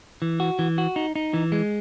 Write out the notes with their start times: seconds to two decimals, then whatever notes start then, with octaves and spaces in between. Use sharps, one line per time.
0.22 E3
0.40 F#4
0.59 E3
0.78 F#4
0.96 D#4
1.16 D#4
1.34 E3
1.52 G#3